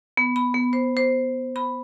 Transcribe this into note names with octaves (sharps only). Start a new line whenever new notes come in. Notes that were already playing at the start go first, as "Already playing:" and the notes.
B3
B5
B3
C5
C5
B5